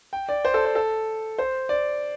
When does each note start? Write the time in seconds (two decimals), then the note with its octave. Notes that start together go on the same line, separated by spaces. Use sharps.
0.13 G5
0.29 D5
0.45 C5
0.54 A4
0.65 C5
0.75 A4
1.38 C5
1.69 D5